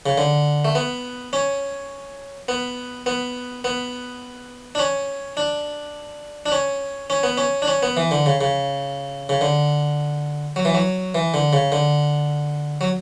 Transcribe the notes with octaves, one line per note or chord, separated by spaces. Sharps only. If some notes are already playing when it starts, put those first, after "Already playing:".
C#3
D3
A3
B3
C#4
B3
B3
B3
D4
C#4
D4
D4
C#4
C#4
B3
C#4
D4
C#4
B3
E3
D3
C#3
C#3
C#3
D3
F#3
E3
F#3
E3
D3
C#3
D3
F#3